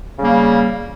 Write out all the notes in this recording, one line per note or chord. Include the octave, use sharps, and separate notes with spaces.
C#3 G3 A#3